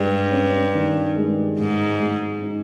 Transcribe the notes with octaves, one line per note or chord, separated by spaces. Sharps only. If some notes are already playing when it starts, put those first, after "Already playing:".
Already playing: G2 G#3
C#4
D#3
G#3
G#2 G#3
G#3
D#4